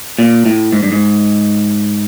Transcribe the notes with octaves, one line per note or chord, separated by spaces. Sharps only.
A#2
A2
G#2
G2
G#2